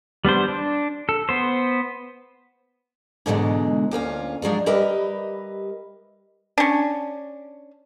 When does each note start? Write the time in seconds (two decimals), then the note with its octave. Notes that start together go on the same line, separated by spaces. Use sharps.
0.25 G3 B3 D4 C5
0.48 D4
1.09 A4
1.29 B3 C5
3.26 G#2 B2 D3 E3 F#3 G#3
3.91 D2 A#3 C#4 F4
4.42 F3 F#3 G#3 D4
4.66 G3 G4 A#4 B4 D#5 E5
6.58 C#4 D4